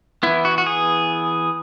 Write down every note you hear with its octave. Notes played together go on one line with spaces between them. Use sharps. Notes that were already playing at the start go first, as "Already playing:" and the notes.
E3 B3 E4
F#4
F#4
G#4